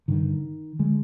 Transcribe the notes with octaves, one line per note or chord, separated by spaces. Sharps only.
G2 D3 D#3
D3 G#3